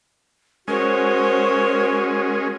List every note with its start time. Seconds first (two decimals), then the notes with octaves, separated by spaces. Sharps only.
0.68 G#3 C#4 F#4 A#4 C5 C#5